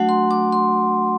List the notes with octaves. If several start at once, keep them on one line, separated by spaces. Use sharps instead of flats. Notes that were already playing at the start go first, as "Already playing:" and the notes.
Already playing: F#3 A3 D4 F#4 F#5
C6
D6
C6